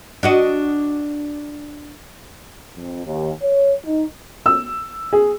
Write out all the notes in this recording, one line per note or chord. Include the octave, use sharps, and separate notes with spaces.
D4 F#4 D#5
F2
D#2
C#5
D#4
E6
G#4